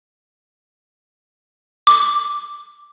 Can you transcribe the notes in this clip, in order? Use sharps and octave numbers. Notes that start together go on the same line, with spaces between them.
D6